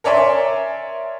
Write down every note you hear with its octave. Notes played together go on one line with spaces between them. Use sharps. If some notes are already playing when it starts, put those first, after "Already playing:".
A#4 C#5 D5 E5 G#5 C6